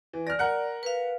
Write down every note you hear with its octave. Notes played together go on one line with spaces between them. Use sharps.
E3
D5 F6 A#6
A#4 F#5 F#6
B4 F5